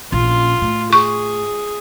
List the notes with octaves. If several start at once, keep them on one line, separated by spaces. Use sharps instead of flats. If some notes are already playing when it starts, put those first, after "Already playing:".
A#1 C#4 F4
A2
G#4 C#6